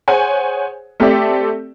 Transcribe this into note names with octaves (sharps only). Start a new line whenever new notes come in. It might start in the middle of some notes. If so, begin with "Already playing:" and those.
G#4 C5 C#5 F#5 G#5
A3 C4 G4 A4 D5 E5